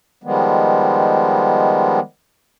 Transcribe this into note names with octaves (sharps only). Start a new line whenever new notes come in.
D#3 F3 G3 G#3 B3